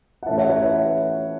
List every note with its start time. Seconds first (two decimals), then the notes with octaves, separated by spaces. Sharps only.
0.23 F#5
0.26 A2 E3 C#4 E4 E5 A5
0.38 C#5 F#5
0.50 C#5
0.62 B4 E5